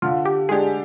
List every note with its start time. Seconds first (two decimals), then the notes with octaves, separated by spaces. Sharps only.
0.02 D3 F4
0.25 G4
0.49 G#3 D4 G4 G#4